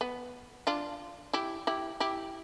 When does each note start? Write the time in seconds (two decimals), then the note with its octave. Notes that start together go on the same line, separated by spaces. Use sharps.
0.01 B3
0.67 D4 F4
1.33 E4 G4
1.67 E4 G4
2.00 E4 G4